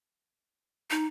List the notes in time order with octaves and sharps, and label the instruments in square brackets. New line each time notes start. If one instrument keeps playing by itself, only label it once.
[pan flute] D#4